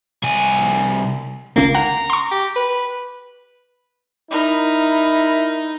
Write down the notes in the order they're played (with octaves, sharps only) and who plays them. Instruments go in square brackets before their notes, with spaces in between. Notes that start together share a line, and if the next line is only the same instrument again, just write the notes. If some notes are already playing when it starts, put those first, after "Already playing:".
[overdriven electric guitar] C2 G#5
[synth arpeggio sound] G#1 C#2 [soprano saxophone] A#3
[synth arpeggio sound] F#5 [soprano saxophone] A#5
[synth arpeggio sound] C6 C#6
[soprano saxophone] G4
B4
[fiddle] D#4 [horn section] E4 A#4 B5